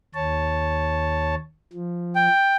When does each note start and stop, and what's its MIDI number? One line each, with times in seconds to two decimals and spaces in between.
0.14 1.35 39
0.14 1.35 73
0.14 1.35 81
1.73 2.28 53
2.15 2.57 79